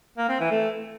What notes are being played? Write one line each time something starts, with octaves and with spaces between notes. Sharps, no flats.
A#3
C4
E3
A3